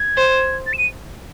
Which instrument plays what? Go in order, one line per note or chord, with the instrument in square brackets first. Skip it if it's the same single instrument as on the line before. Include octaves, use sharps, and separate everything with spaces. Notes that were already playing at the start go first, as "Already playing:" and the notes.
Already playing: [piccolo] G#6
[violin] C5
[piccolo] A6
E7
D#7